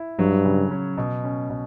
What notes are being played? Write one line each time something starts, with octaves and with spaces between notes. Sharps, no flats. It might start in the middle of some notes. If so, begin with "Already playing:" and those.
Already playing: E4
G2 F#3
C#3
C#4
B2
C#4
B2